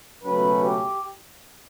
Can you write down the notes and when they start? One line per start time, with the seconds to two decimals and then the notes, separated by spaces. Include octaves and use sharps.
0.23 C#2 B2 F#3 A3 C#4 B4
0.62 G4